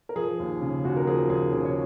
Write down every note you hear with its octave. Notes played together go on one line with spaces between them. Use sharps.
A#4
F3 G#4
D#2
C#3
D#2 F#4
A#4
F3 G#4
D#2 G#4
C#3 G#4
C#5